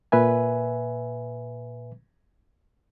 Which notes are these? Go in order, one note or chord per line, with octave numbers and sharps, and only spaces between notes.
A#2 B4 E5 G#5